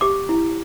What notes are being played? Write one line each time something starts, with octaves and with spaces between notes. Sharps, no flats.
G4 D6
E4